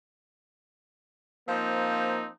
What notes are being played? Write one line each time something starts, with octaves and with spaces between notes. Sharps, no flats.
F3 A#3 C4 D#4